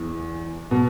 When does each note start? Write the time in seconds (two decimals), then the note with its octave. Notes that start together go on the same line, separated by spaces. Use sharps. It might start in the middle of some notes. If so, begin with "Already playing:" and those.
Already playing: E2 E3
0.71 B2